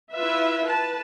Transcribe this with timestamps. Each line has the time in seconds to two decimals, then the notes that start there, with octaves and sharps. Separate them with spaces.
0.14 E4 F4 B4 E5
0.66 B4 A5